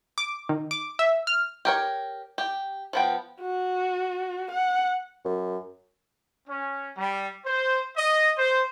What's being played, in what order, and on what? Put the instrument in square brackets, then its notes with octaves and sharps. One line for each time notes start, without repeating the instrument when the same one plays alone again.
[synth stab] D6
D#3
D6
E5
F6
[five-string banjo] G4 A#4 C#5
G4
F3 B3 G5
[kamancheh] F#4
F#5
[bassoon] F#2
[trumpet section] C#4
G3
C5
D#5
C5